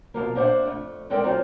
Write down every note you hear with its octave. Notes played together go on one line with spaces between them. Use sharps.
B2 F3 A#3
A#3 D4 C5 C#5 E5 F#5
F2 A3
G#3 C4 A4 A#4 D5 G5
F#3 A#3 C4 C#4 D#4 F4